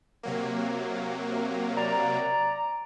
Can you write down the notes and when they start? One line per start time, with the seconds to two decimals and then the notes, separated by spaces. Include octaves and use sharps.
0.23 C3 F#3 A#3
1.77 D5 A#5